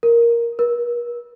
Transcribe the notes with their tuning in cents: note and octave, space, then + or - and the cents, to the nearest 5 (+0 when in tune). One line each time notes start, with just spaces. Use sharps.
A#4 +5
A#4 +45